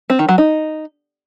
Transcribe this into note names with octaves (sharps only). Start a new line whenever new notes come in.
C4
D#3
F#3
D#4